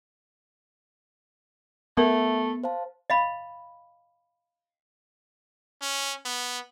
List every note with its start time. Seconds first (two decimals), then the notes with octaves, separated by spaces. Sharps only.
1.97 A3 B3 A#4 E5
2.64 C5 F5 A5
3.10 D#5 F5 B5
5.82 C#4
6.26 B3